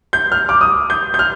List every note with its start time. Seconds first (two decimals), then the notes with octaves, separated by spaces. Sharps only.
0.13 G6
0.32 F6
0.49 D6
0.61 D#6
0.90 G6
1.14 G6
1.19 F6